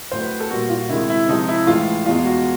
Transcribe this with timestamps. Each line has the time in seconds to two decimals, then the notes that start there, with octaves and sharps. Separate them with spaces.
0.12 A2 F#3 A3 C5
0.22 B4
0.40 A4
0.50 A#2 G3 A#3 F#4
0.70 F4
0.89 C3 D#3 G#3 E4
1.09 E4
1.28 C3 F3 G#3 D#4
1.48 E4
1.67 A2 E3 G#3 F4
2.06 E2 B2 G#3 F4
2.25 F#4